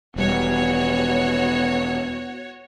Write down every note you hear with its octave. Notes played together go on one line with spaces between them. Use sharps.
E1 G3 B3 F#4 C#5